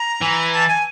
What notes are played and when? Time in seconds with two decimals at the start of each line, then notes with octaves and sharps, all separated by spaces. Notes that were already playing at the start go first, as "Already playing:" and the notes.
Already playing: A#5
0.21 E3
0.53 A5
0.69 G#5